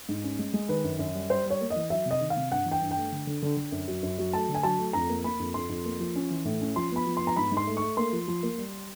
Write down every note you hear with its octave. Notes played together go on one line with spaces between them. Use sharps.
G#2
C#4
G#3
G#3
D#3 B4
F#2
F#2
G3
G3 C5
G3
C#5
A#3
D#5
E3
F#3 E5
C3
D#5
D#3
F5
C3
G2 F#5
E3
G5
G2
G5
A3
D3
D3
D3
D3
F#2
F#3
F#2
F#3
A3 A5
D3
G#5
F#3 A5
A3
F2 A#5
A#3
A#3 B5
F2
F2 C6
F2
A#3
F3
C#4
E3
A2
C#4
F3 C6
B3 B5
F3
B3 C6
A#5
G#2 B5
G#2
C6
A3
A3 C#6
A#3 C6
F3
F3
A#3
G3